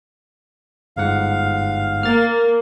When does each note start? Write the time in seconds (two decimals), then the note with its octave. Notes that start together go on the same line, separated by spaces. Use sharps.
0.97 G1 G#2 F5 F#5
2.03 A#3 F6 A6